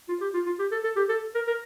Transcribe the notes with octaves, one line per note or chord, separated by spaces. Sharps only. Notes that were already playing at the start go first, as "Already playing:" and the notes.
F4
G4
F4
F4
G4
A4
A4
G4
A4
A#4
A#4